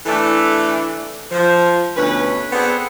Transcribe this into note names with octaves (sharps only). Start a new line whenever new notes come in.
E3 A3 D4 A4
F3
D2 B2 C#4 B4
B3 C4 G#4 A4 D5 F#5